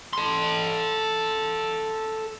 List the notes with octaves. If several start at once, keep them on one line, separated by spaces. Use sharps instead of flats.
A4 C6